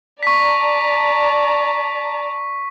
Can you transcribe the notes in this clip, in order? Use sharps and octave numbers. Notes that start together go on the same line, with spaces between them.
D5 A5 A#5 C#6 B6